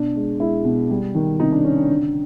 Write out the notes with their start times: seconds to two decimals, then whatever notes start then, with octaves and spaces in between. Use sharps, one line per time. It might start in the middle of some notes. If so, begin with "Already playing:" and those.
Already playing: B2 D4
0.15 G#3
0.40 G#3 E4
0.65 B2
0.90 G3
1.15 D#3
1.40 C3 D#4
1.52 D4
1.64 C3 C#4
1.77 D4
1.89 D3